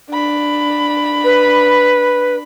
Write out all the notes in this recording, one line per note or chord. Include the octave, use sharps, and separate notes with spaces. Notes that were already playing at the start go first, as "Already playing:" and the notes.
D4 B5
B4